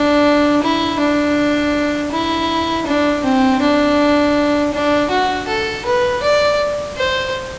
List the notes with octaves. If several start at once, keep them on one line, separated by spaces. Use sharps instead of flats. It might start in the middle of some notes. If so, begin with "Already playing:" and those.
Already playing: D4
E4
D4
E4
D4
C4
D4
D4
F#4
A4
B4
D5
C5